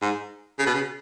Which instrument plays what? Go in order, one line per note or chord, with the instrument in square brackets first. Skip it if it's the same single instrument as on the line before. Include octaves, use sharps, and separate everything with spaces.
[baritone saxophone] G#2
C#3
B2
C#3